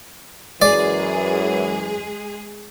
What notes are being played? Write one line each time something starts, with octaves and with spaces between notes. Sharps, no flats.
F#2 E3 F#3 G#3 G#4 D5